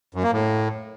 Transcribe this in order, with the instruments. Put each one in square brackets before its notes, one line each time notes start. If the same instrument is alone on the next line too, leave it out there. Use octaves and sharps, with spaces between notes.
[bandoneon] F#2
A#3
A2